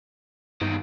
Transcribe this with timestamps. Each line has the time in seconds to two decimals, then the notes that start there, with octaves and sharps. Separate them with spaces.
0.61 E2 G2 D#3